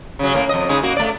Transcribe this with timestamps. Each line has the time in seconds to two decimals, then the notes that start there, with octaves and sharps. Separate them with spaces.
0.19 C#3 F#3
0.34 A2 A#3
0.49 F2 D#5
0.69 C#3 G#3 D#4
0.83 A#3 F#4
0.97 A3 D5